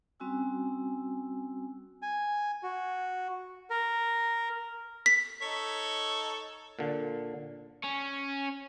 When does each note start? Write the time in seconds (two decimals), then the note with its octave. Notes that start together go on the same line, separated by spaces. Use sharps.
0.20 G3 C4 C#4 F#4 G#5 E6
2.02 G#5
2.63 F#4
3.70 A#4
5.06 B6
5.42 D#4 A4 C#5
6.79 A#2 D3
7.84 C#4